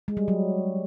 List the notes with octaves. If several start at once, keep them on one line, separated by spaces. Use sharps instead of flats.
G#3
G3
F#3